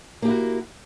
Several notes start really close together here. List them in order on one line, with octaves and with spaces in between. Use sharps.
A#3 G4 E4 F#4